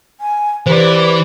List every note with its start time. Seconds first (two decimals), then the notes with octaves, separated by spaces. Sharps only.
0.21 G#5
0.67 E3 G4 B4 C5 D5